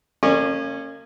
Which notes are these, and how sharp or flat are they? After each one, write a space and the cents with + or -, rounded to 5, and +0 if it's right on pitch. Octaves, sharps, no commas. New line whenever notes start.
A#3 -35 C#4 -15 D5 +45